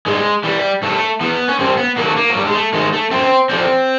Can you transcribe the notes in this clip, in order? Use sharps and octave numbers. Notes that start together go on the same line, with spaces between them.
G2 G#3
E3 G3
G2 A3
E3 B3
C#4
G2 C4
B3
D#3 F#3 A#3
A3
A#3
F#3
G2 G3
G#3
A3
D#3 F#3 G#3
A3
F#2 C4
D3 F3 C4